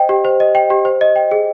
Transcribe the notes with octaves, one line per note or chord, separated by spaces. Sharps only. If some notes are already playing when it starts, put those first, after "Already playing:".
Already playing: C5 D#5 G5
G4
C5
D#5
G5
G4
C5
D#5
G5
G#4